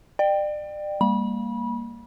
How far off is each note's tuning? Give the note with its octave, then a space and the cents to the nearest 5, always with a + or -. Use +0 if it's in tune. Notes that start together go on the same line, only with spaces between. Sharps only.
D5 +35 G5 +0
G3 +35 A#3 +0 B5 -30